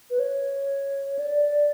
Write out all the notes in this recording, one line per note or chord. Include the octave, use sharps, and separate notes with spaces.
B4
C#5
D5